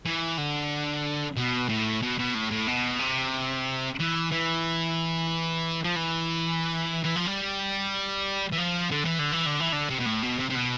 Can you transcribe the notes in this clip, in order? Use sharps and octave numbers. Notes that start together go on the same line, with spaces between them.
E3
D3
B2
A2
B2
B2
A2
A2
B2
C3
E3
E3
F3
E3
E3
F3
G3
E3
F3
D3
E3
D3
E3
D3
E3
D3
C3
B2
A2
B2
C3
C3
B2